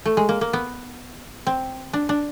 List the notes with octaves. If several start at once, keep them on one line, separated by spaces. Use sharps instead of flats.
A3
G#3
A#3
A#3
B3
C4
D4
D4